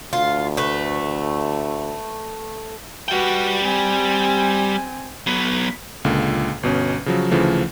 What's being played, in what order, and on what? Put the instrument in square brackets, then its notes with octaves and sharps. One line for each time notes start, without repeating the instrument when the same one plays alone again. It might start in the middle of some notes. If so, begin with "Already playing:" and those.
[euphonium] D2 [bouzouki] F4
[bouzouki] A3 B4
[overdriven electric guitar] G3 G5 [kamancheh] F#4 B4
[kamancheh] C4 G#5
[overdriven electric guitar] F#3 B3
[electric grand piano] C#2 A#2 D3
G1 B2 C#4
C#3 F3 F#3
D2 C#3 E3 F3 A3